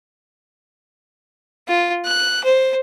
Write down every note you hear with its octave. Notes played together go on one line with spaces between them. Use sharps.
F4
F#6
C5